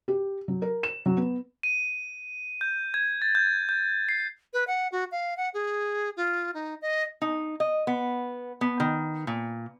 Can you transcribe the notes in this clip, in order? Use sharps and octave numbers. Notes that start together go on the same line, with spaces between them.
G4
F#3
A#4
E7
F#3
B3
D#7
G6
G#6
A6
G6
G6
C7
B4
F#5
F#4
F5
F#5
G#4
F4
D#4
D#5
D#4
D#5
B3
B3
D#3
A#2